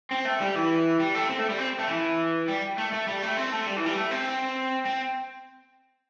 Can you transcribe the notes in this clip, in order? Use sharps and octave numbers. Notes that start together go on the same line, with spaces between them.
C4
A3
G3
E3
G3
A3
C4
A3
G3
C4
A3
E3
G3
A3
A3
G3
A3
C4
A3
G3
E3
G3
A3
C4
C4